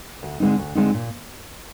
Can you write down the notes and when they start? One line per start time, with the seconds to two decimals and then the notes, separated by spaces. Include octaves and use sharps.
0.23 D2
0.40 D3 G#3 C4 D#4
0.58 D2
0.75 D3 G#3 C4 D#4
0.94 A#2